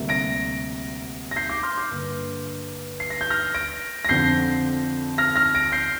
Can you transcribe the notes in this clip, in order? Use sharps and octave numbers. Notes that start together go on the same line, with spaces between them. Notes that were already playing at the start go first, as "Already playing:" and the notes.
Already playing: D2 C3 G3 A#3
A#6 D7
A#6
G6 C7
D6 G6
C6 F6
D6 G6
G2 D3 A#3
C7
A#6
G6
F6 A#6
A#6 D7
A#6
F2 D3 F3 C4 G6 C7
F6 A#6
F6 A#6
A#6 D7
G6 C7